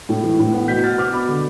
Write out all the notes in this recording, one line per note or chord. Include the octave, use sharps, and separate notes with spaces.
A2
E3
A2
B3
B2 G6 B6
B3 F6 A6
B3 D6 F6
B2 B5 D6
D3